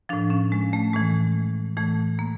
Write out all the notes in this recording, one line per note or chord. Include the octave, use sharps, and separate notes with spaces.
A2 F3 D4
C#4
G#3
A3
A2 E3 G#3
A2 E3 A3
A#3